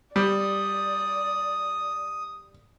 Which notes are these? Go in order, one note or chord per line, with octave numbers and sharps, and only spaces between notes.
G3 D5 D#6